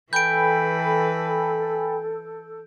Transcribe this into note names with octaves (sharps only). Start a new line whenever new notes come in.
E3 A4 B4 G5 G#5 B5 G6 D7